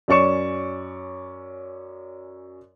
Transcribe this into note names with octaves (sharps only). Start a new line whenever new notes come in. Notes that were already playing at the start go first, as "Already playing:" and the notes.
F#2 C#4 D5 C#6 C#7 E7